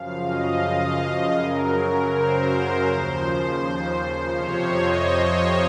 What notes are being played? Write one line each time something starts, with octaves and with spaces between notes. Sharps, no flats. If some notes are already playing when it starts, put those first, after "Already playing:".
Already playing: F#2 C#3 F3 F5
D#5
F#2 C#3 F#3 A#4
A#4
C5
D#2 C#3 F3
F2 C3 F3 C#5
D#5
D#5